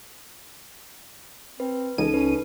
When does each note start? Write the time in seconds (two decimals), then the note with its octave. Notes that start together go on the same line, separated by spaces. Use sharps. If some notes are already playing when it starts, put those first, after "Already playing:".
1.60 C4 B4
1.98 C#2 E3 D#4 A4 D#7
2.14 C#4 B4